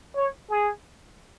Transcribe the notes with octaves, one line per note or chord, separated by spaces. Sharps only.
C#5
G#4